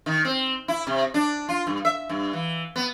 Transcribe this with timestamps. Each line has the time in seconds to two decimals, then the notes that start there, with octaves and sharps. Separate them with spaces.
0.06 D#3
0.25 C4
0.68 E4
0.87 C3
1.14 D4
1.49 F4
1.67 G2
1.85 E5
2.09 G2
2.33 E3
2.76 B3